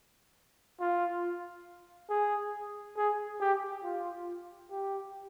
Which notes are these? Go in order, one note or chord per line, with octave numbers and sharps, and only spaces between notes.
F4
G#4
G#4
G4
F4
G4